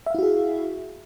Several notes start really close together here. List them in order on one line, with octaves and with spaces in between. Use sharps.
E5 F5 E4 F#4 G#4